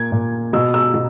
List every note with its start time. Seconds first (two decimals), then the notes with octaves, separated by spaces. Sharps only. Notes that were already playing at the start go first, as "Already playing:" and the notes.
Already playing: A#2 G#6
0.12 A#2
0.53 B2 E6
0.74 E6
0.94 B2